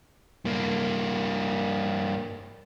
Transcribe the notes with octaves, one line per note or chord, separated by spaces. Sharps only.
G2 A#3